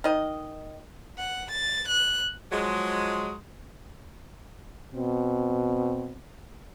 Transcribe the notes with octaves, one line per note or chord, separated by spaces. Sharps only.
D#3 D#5
F#5
A6
F#6
F3 F#3 G#3
B2 C4